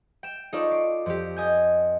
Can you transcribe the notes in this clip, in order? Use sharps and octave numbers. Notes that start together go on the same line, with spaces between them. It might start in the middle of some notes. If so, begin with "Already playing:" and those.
G5 E7
D#4 F4 A4 C#5 D5
D6 C7
F2 G4
D#5 G#5 G6